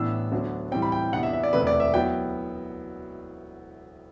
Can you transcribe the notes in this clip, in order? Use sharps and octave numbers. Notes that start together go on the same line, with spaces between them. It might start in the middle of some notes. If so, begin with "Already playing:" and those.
Already playing: A1 A2 E3 B3 D4 E6
D2 D3 F#3 B3 D4
A2 E3 G3 C4 G5
B5
G5
E2 C3 E3 B3 D4 F#5
E5
E5
D5
E1 D2 C3 E3 A3 B4
D5
E5
F#3 B3 E4 G5